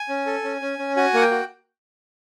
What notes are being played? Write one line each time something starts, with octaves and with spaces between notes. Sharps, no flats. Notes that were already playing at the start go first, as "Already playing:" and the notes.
Already playing: G#5
C#4
A4
C#4
C#4
C#4
F#4 G#5
A#3 F#5
G5
F#4